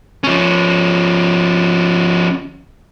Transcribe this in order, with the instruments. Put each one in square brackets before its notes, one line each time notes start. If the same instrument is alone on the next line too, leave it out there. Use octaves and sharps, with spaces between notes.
[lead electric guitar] F3 C#4